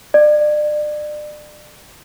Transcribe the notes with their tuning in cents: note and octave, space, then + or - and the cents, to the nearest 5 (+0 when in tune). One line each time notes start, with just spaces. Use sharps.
D5 +35